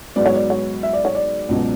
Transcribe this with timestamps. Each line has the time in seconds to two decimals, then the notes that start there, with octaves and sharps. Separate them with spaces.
0.16 G#2 F#3 B3 D5
0.26 C#5
0.34 D5
0.50 C#5
0.83 E5
0.93 D5
1.05 C#5
1.15 D5
1.49 C#2 B2 F#3